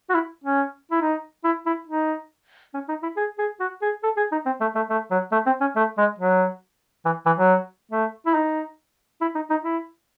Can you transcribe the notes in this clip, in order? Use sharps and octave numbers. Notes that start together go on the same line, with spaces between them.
F#4
E4
C#4
E4
D#4
E4
E4
D#4
C#4
D#4
E4
G#4
G#4
F#4
G#4
A4
G#4
D#4
C4
A3
A3
A3
F#3
A3
C4
C#4
A3
G#3
F#3
E3
E3
F#3
A3
E4
D#4
E4
D#4
D#4
E4